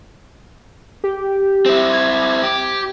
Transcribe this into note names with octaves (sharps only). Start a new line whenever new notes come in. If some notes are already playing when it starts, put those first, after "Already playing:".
G4
C4 E4
G#6
G4